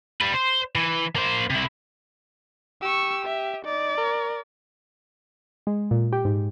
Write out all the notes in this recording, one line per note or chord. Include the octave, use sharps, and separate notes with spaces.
G3 B4
C5
E3
A#3 C5
C3 E4
G4 C#6 E6
E5
D#4 D5
A#4
G#3
A#2
G4
G#2